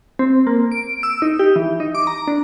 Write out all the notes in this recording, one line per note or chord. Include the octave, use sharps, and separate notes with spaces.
C4
A#3
D7
E6
D#4
G4
E3
D#4
D6
A#5
D4